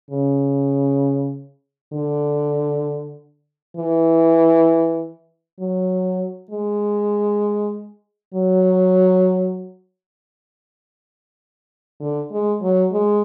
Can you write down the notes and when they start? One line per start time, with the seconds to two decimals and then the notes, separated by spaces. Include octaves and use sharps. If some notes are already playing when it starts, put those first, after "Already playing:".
0.10 C#3
1.93 D3
3.77 E3
5.60 F#3
6.51 G#3
8.34 F#3
12.00 D3
12.31 G#3
12.62 F#3
12.92 G#3